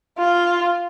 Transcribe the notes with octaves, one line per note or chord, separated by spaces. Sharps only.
F4